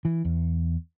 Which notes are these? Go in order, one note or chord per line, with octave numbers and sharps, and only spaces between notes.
E3
E2